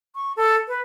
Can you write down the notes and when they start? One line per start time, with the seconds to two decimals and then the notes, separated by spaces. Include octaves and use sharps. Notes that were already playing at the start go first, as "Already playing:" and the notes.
0.15 C#6
0.37 A4
0.68 B4